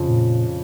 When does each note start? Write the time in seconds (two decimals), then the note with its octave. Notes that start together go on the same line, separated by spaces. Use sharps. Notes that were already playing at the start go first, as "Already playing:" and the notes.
Already playing: F2 C#3 F3
0.09 A#2